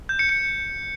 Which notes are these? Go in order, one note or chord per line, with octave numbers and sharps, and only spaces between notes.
G6
C#7
C#7